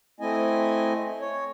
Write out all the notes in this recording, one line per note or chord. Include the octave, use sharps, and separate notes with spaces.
A3 C4 E4 D#5 G#5
C#5